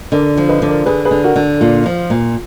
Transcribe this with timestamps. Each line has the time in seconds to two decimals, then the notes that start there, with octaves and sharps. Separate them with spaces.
0.12 D3 A#4 D5
0.37 F3
0.49 B4 D#5
0.62 D3
0.68 A#4 D5
0.86 D3 G#4 B4
1.05 G#4 B4
1.11 D3
1.24 F#4 A#4
1.36 D3
1.61 A#2 F4
1.86 F3
2.10 A#2